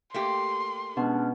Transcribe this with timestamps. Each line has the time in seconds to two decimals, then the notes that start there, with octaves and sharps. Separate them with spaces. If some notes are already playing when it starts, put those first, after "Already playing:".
0.14 A3 A#3 G4 C6
0.97 B2 G#3 C#4 D4